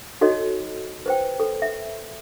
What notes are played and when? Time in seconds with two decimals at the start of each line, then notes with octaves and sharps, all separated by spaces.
0.21 D#4 F#4 A4 C#5 D#5
1.06 B4 C5 G5
1.40 A4
1.62 E5